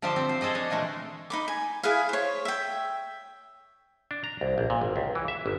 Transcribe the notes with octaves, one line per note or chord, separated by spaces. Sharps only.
D3 F3 G4 C5 E5 A5
C4
C5
G#4 A4 C5 D#5 G5
D4 C#5 D#5
A#2 D3 E3 G#3 A3
D#4 B5 D6
G#5
E4 G#4 B4 F5
C5 C#5
E5 G5
D4
A#5
C2
A#1
A#2
G#1
C#2
E3
E5
G1